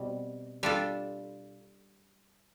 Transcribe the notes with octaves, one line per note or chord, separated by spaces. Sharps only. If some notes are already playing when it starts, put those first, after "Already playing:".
Already playing: B2 G3 C4
G3 D4 F4 A4